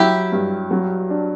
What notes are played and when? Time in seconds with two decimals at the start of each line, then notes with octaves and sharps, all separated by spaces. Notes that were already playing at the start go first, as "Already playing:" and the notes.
Already playing: F#3 E4 G4
0.32 G2
0.71 F#3
1.10 D4